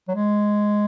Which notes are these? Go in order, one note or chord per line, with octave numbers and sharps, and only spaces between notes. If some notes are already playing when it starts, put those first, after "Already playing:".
F#3
G#3